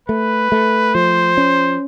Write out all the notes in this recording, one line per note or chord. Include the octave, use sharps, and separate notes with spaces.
A3 B4
A3
F3 C5
C#4